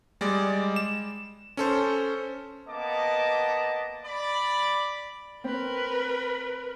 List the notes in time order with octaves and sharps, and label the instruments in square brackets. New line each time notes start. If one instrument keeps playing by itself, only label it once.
[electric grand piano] G3 G#3 D5
E7
C#4 A4 C5
[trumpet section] A#3 B3 D#5 A5 D6
D5 B5
[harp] C4 [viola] A#4 B4